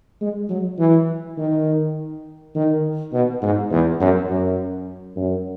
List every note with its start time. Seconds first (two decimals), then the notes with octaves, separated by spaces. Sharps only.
0.21 G#3
0.49 F#3
0.79 E3
1.38 D#3
2.55 D#3
3.13 B2
3.42 G#2
3.71 E2
4.00 F#2
4.29 F#2
5.16 F#2